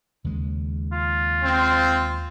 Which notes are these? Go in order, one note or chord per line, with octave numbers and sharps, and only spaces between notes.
D#2 C#3 G#3
F4
C4